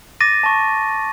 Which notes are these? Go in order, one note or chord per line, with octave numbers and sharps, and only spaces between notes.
D6 A6 A#6 D#7
A5 C#6